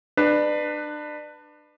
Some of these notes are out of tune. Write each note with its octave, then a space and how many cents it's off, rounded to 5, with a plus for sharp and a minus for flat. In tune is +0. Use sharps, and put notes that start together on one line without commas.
D4 +30 B4 +5